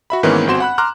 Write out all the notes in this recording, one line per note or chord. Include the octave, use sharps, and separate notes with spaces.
F#4 E5 B5
G#2 D#3 E3 A#3 B3 C#4
G1 C4 F#4 C6 E7
F#5 B5 F#6
A#5 C6 D6 F6 F#6